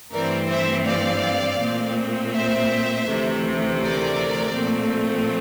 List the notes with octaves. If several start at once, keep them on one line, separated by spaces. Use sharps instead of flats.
G2 E3 A3 C4 A#4 D5
C5 E5
D5 F5
A#2 A3 C4
C5 E5
D2 C3 E3 A3
A#4 D5
A#2 F3 A3 C4